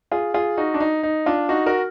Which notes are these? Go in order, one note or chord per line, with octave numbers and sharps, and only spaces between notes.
F4 G#4
F4 G#4
D#4 F#4
D4
D#4
D#4
D4 F4
D#4 F#4
F#4 A#4